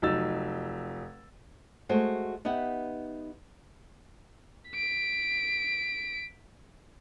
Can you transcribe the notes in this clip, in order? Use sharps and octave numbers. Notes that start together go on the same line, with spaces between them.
F1 F#3 D#4 E6 A6
G#3 A3 F#4 C5
B3 D#4 G4 E5 F#5
B6 D7